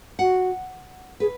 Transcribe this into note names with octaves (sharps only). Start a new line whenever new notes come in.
F#4 F#5
G#4 B4